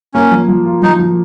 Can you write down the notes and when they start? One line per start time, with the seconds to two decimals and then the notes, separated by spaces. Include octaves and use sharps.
0.14 A#3 C#4
0.31 F3
0.48 F3
0.65 F4
0.82 F3 D#4
0.99 F3